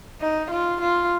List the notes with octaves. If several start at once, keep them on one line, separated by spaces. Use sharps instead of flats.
D#4
F4
F4